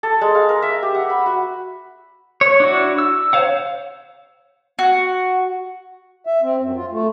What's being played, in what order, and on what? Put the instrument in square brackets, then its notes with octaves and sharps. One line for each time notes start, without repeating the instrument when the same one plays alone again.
[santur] A4
G#3
F5
A#4
E5
G4
F#5
B5
F#4
[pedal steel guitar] C#5
D4 E4 F#4
E6
C5 C#5 F5 F#5
[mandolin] F#4
[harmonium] E5
C4
F#2
F4
A3